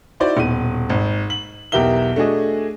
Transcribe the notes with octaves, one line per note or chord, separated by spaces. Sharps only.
D#4 E4 F#4 C5 D5
D#1 B2 D#7
G#1
F#7
B1 E2 G4 A#4 E5 G7
A3 D4 F#4 G#4 D#5